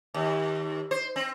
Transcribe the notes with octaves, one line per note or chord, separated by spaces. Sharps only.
D#2
C5
C4